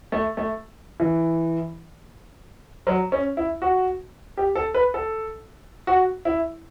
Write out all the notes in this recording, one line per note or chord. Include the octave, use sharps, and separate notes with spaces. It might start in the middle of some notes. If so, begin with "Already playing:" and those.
A3
A3
E3
F#3
C#4
E4
F#4
G4
A4
B4
A4
F#4
E4